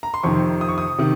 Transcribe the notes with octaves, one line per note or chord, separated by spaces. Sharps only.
A#5
C6
F2 C3 D#3 C#6
D#6
C#6
D#6
C3 D#3